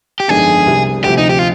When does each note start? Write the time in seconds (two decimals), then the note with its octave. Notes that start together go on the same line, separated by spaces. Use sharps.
0.20 G4
0.28 G1 F2 D#3 G#3 D4 G#4
0.67 C2 C3 G3
1.04 D2 C3 F3 G4
1.18 D#4
1.29 G4
1.39 F4